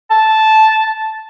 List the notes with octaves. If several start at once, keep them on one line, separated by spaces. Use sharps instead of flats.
A5